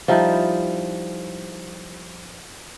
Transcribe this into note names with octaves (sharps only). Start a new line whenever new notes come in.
F3 G3 D#4 E4